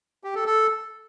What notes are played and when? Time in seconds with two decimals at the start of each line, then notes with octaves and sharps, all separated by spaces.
0.24 G4
0.35 A4
0.46 A4